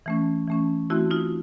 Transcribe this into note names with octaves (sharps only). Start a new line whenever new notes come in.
E3 A3 C#4
E3 A3 C#4
E3 A3 C4 E4 F#4
D#4 F4